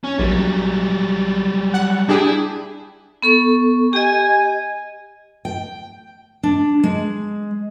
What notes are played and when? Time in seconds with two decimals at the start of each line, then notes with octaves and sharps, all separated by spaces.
0.04 C#4
0.19 A#1 F#3 G3
1.74 F#5
2.09 D4 E4 G4 G#4
3.22 B3 A4 C#6
3.93 G4 D#5 G#5
5.45 G5
6.43 D4
6.83 G#3